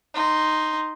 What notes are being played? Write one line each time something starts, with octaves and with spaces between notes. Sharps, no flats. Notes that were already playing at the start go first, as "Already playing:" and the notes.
D#4 C6